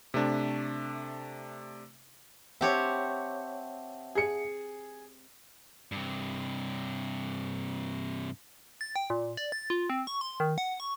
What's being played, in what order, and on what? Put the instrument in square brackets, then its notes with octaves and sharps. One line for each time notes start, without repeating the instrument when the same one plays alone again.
[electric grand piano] C3 A3 D4
[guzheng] C4 G4 C#5 [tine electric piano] E5 F#5 A5
[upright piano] G#4 C#7
[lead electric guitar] G2 C3
[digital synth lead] A6
G5
A#2
D5
A6
F4
C4
C#6
C6
D#3
F#5
C#6